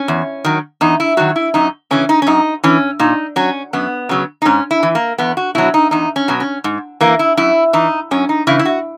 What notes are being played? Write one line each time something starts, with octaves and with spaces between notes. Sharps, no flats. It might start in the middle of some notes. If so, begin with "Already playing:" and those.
Already playing: C#4
E2
D#3 F#3
E2 D#4
E4
D#3 F#3 F#4
E4
F#2 D#4
C#3 E3 C#4
D#4
C#4
F#2 D#4
E3 C#4
A#2 D#4
F#3 C#4
F#2 B3
C#3 F#3
D#4
G#2 C#4
E4
E3
A#3
E2 B3
F#4
B2 F#3 E4
D#4
E2 D#4
C#4
B2 F#3
C#4
G#2
E3 A#3
E4
F#2 E4
E3 D#4
F#2 C#4
D#4
C#3 E3 E4
E4
F#4